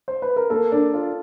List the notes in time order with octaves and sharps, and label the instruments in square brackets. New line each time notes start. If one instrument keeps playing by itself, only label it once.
[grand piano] C5
B4
A#4
[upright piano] A#3 [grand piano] A4
[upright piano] D4
F4